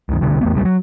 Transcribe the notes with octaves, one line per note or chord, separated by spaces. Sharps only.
C#2 G2 D#3
C2 B2 D3 G3
E2 A3 B3
D#1 C2 C#3 G3
F#3